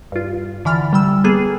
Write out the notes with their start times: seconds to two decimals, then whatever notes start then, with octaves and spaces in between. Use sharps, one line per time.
0.12 G2 F4
0.65 D3 E3 B5 F6 A6
0.93 G3 G5 E6
1.24 A#3 B3 G#4 A4